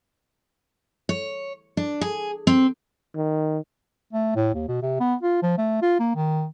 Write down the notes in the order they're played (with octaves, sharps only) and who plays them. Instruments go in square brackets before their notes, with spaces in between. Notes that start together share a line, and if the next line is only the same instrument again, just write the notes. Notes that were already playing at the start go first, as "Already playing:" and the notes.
[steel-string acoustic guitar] C#5
D4
G#4
C4
[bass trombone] D#3
[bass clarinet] A3
A2
D#2
B2
C3
B3
F4
F3
A3
F4
A#3
D#3